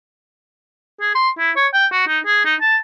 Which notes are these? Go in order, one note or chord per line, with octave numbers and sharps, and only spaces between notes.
G#4
C6
E4
C#5
G5
F#4
D#4
G#4
D#4
A5